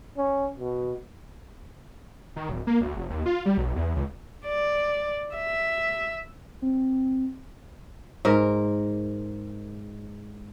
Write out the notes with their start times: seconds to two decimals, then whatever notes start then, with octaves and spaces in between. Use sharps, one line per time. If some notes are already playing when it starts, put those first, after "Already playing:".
0.17 C#4
0.59 B2
2.36 D#3
2.49 D1
2.67 A#3
2.81 D2
2.96 F1
3.10 D#2
3.26 F4
3.46 G3
3.58 B1
3.76 E2
3.96 C#2
4.46 D5
5.36 E5
6.62 C4
8.25 G#2 A#4